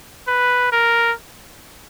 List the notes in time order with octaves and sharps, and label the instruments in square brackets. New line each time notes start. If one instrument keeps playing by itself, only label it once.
[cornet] B4
A#4